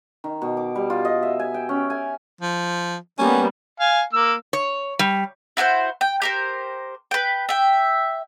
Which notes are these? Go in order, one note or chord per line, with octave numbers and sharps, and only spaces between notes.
D#3
B2
D6
G3
F4
D#5
E5
G#5
G5
C#4
G#5
F3
G3 A#3 B3 C#4
F5 G#5
A#3 E6
C#5
G3
E4 F#4 A4 C5
G5
G4 A#4 C5
B4 G5
E5 G5